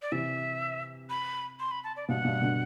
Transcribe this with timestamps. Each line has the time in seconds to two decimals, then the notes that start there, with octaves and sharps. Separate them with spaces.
0.02 D5
0.12 C3 E3 E5
1.10 B5
1.60 C6
1.71 B5
1.84 A5
1.96 D5
2.08 G2 B2 F#5
2.25 G2 B2
2.41 B2 D3